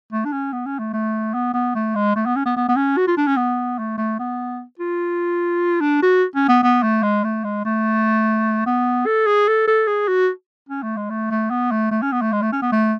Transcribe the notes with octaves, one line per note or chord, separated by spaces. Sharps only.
A3
D4
C#4
B3
C#4
A3
A3
B3
B3
A3
G#3
A3
B3
C#4
B3
B3
B3
C#4
F#4
F4
D4
C#4
B3
A3
A3
B3
F4
D4
F#4
C#4
B3
B3
A3
G#3
A3
G#3
A3
B3
A4
G#4
A4
A4
G#4
F#4
C#4
A3
G#3
A3
A3
B3
A3
A3
C#4
B3
A3
G#3
A3
C#4
B3
A3